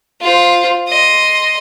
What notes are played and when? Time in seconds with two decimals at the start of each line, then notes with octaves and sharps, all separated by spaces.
0.21 F4 C5
0.88 D#5 C6